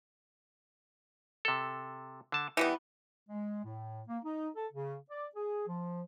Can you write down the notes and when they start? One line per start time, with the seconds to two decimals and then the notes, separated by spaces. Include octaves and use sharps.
1.45 C3 A4
2.32 D3 A5
2.57 E3 G3 B3 D#4
3.29 G#3
3.64 A2
4.08 A#3
4.24 D#4
4.56 A4
4.73 C#3
5.10 D5
5.35 G#4
5.67 F3